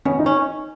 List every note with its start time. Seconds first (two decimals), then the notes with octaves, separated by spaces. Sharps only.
0.05 B2 C#4
0.19 D#4
0.26 C#4